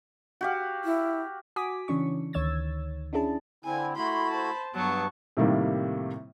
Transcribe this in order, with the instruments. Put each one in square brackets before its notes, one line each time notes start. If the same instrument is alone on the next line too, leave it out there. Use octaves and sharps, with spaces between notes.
[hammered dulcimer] F#4 G4 F5
[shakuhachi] E4
[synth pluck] F#4 G#5 D6 D#6 B6
C#3 E3 C#4 D4 C#6
D2 D#3 C#5 E6 G#6 A6
C#4 D4 E4 G#4 A5
[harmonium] D3 C4 E4 [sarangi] G#5
[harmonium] A3 E4 F#4 [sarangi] B5 [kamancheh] C6
[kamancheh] C5 A5
[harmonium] G2 B3 [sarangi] F#3 [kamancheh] A5 C#6
[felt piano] A2 C3 D#3 G3 A#3